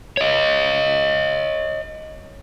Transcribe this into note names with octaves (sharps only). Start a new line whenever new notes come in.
C#5 D#5